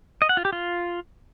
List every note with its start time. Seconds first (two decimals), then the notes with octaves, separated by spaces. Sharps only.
0.22 D#5
0.29 F#5
0.37 F4
0.45 G4
0.53 F4